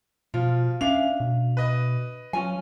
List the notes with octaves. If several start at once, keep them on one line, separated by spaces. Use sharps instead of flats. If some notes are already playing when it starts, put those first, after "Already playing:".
B2 F3 F4
C#4 D4 E5 F5 F7
B2
B4 D#5
F#3 C#4 F4 G#5